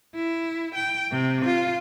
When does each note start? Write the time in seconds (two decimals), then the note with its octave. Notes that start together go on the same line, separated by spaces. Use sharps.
0.16 E4
0.75 G5
1.11 C3
1.45 F4